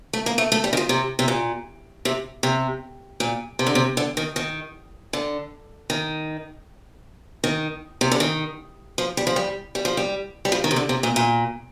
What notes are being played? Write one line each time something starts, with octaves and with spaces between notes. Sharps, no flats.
A3
A#3
A3
A3
G3
D#3
F3
C3
C3
A#2
C3
C3
A#2
C3
D3
C3
D3
D#3
D#3
D3
D#3
D#3
C3
D3
D#3
F3
G3
F3
G3
G3
F3
G3
G3
F3
D#3
C3
D3
C3
A#2
A#2